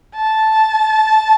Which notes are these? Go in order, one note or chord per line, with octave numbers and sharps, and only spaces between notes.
A5